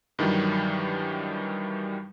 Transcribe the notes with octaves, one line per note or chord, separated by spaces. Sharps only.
G2 D#3 E3 F#3 G3